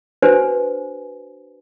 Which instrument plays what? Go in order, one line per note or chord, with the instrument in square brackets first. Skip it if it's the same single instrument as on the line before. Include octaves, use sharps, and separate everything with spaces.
[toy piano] D4 F#4 B4 C5 G#5